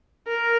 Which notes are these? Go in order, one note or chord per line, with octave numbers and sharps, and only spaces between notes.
A#4